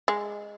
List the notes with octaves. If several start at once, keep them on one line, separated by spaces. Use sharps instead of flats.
G#3